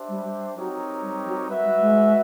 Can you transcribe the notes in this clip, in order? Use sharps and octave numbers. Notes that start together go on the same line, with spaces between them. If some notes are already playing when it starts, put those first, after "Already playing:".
Already playing: D4 G4 C5 E5
G3
F#3 C4 D#4 G4 A#4 C#5
G3
F#3
G3 F#4 B4 E5
G3
G#3